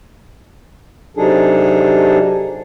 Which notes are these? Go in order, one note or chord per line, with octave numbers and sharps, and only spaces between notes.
C3 F#3 D4 D#4 G#4 A4